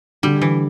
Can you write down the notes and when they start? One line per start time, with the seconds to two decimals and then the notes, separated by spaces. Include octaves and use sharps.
0.23 D3 G3
0.41 E3